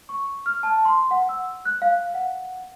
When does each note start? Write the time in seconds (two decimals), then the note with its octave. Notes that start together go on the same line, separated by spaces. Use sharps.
0.09 C#6
0.46 F6
0.63 A5
0.85 C6
1.11 F#5
1.29 E6
1.65 F#6
1.82 F5
2.14 F#5